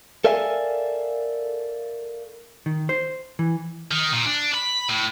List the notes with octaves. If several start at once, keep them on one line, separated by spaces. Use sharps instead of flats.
A4 A#4 D5 E5 F5 G#5
D#3
C5
E3
D#3
A#2
D4
B5
A2